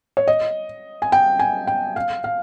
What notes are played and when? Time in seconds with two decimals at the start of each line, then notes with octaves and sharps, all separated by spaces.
0.17 C#5
0.28 D#5
1.02 G#5
1.12 G5
1.39 G#5
1.67 G5
1.96 F5
2.24 F5